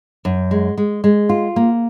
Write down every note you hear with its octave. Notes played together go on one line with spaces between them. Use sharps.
F#2
G#3
G#3
G#3
F4
A#3